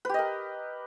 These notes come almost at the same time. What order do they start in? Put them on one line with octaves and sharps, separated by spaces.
B4 G4 D#5 A#4